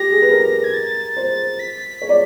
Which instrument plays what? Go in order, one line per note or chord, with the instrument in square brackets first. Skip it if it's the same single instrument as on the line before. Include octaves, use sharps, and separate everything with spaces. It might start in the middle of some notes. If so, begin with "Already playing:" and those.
Already playing: [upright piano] G4 [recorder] A#6
[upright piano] G#4
B4
A#4
[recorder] G#6
A6
[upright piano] C5
[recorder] B6
[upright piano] C#5
D5